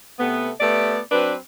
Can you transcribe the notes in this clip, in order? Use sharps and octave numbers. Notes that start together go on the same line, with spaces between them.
C3 A3 B3
A3 B3 G4 D5
F#3 C4 D4 B4